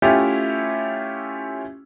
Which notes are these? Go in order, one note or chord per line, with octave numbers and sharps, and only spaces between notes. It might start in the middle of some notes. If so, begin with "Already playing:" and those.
A3 C#4 E4 F4 G4